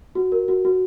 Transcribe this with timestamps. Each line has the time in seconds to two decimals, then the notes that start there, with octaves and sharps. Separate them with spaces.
0.15 F#4
0.32 A#4
0.48 F#4
0.65 F#4